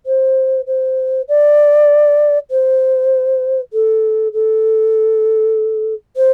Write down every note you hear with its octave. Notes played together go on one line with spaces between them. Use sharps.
C5
C5
D5
C5
A4
A4
C5